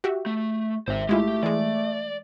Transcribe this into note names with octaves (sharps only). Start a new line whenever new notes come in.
F#4 G4 E5
A3
G#1 C5 E5
G#3 A3 E4 F4 G4
E3 G#3 D5